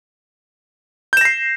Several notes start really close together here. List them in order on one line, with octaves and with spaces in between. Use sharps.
G6 E7 A#6 C7